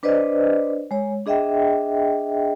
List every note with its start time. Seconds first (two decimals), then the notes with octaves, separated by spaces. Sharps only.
0.03 D4 B4 C5 D5 D#5
0.91 G#3 C#5
1.26 D4 G#4 D#5 E5 G5